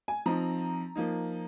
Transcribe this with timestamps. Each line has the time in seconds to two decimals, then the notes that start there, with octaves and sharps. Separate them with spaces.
0.08 G#5
0.26 F3 C4 D#4 A#5
0.95 F3 A#3 D#4